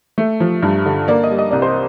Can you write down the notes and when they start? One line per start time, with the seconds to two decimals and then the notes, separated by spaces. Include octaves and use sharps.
0.18 A3
0.40 F3
0.63 G2
0.86 D3
1.08 A#3 D5
1.24 D#5
1.31 G3
1.39 D#5
1.51 C2 D5
1.62 C5